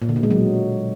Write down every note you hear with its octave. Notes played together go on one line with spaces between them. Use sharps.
A#2
D3
B2
G#3
F#3